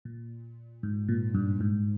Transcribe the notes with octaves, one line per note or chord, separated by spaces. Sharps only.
A#2
G#2
A#2
G2
G#2